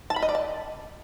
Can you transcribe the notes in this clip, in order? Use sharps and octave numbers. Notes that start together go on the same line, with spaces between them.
A5
B5
D#5
D5
A5